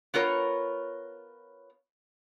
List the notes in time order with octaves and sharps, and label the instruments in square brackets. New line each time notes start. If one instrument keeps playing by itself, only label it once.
[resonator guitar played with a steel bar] B3 F4 A#4 C#5